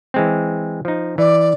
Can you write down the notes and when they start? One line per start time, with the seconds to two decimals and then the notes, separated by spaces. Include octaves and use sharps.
0.14 E3 G#3 C4
0.85 F3 D#4
1.18 E3 D5